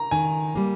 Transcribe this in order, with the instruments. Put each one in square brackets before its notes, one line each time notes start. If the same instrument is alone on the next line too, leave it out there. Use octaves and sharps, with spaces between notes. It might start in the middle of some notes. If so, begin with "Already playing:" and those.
Already playing: [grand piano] A#5
[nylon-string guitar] D#3 [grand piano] G#5
[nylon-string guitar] G3 A#3